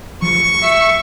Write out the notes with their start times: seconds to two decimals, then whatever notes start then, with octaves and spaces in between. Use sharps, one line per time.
0.22 F3 C#6
0.63 E5